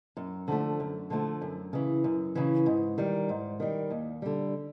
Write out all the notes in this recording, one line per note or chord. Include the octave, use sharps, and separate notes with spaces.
F#2
D3 F3 A3
F#2
D3 F3 A3
F#2
C#3 E3
F#2
C#3 E3
G#2
D#3 G3
G#2
D#3 G3
D#2
D3 G3